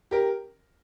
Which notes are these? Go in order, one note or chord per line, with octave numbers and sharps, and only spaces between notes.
G4 A#4